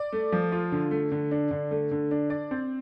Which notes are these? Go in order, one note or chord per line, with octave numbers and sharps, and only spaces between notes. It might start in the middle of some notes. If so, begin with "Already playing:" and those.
Already playing: D5
A3
F3
F4
D3
A3
D3
D4
D3
A3
D3
D4
D5
C4